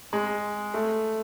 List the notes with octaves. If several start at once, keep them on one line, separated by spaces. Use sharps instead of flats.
G#3
A3